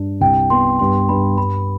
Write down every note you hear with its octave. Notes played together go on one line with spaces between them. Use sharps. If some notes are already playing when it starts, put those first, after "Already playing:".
Already playing: G2 D4
C2 G5
B3 C6
G2 C6
G2 B5
G2 B5